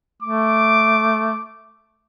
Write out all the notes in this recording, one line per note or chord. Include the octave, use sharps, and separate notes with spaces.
A3 D6